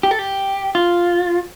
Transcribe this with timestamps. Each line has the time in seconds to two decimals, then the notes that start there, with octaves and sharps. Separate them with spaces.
0.03 G4
0.11 A4
0.19 G4
0.75 F4